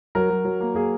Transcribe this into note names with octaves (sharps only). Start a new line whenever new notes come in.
F#3 A#4
F#3
F#3
A#3
A#3 G#4